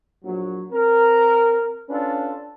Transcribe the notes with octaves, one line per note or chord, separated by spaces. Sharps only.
A#1 F#3
C4 A#4
C#4 D4 F4 A4 B4